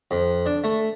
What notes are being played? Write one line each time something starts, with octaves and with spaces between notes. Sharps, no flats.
F2
D4
A3